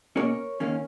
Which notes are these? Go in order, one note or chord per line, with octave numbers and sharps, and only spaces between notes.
B2 A#3 C#4 A#4 C#5
D#2 D#3 A#3 C#4